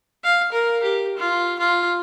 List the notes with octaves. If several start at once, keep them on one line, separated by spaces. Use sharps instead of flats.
F5
A#4
G4
F4
F4